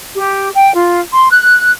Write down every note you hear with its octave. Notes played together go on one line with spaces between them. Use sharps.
G4
G5
F4
C6
F#6